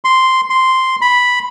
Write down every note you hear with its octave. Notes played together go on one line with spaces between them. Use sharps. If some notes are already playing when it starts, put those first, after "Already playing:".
C6
C6
B5